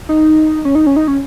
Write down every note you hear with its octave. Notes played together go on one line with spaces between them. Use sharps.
D#4
C#4
D#4
C#4
D#4
C#4